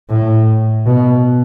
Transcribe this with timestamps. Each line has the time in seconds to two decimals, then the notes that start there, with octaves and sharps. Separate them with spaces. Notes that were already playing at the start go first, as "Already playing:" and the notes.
0.10 A2
0.87 B2